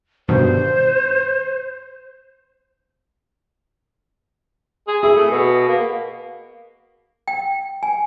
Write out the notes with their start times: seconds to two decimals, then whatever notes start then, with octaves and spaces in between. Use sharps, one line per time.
0.29 G2 B2 D#3 C5
4.87 G#4
5.03 E4 G#4
5.15 A3
5.31 B2
5.69 A#3
7.28 G5
7.83 G#5